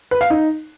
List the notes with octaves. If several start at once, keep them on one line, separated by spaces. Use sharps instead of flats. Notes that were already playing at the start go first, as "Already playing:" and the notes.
B4
F5
D#4